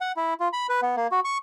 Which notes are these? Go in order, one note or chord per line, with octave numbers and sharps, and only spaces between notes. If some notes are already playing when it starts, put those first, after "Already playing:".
F#5
E4
F4
B5
B4
B3
A#3
F#4
C#6